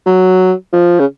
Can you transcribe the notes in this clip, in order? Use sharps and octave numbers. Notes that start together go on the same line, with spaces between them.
F#3
F3
C#3